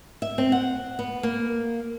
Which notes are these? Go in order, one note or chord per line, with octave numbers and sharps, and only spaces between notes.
E5
C4
F#5
B3
A#3